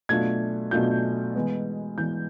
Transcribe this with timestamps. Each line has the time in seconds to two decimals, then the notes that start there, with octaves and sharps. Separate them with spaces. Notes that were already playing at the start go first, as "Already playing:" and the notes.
0.09 B2 F#3 A3 D4 F4 G#6
0.71 B2 F#3 A3 D4 F4 G6
1.35 E3 G#3 B3
1.98 E3 G#3 B3 G6